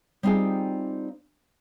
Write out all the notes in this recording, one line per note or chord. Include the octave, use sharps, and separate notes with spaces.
G3 C4 D#4 F4 G4 G#4